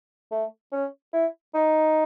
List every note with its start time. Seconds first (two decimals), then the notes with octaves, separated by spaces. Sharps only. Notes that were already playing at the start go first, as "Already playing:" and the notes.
0.32 A3
0.72 C#4
1.13 E4
1.54 D#4